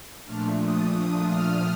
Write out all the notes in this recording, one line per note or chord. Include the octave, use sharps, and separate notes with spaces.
A#2 F3 A3 D4 F6
D#6
F6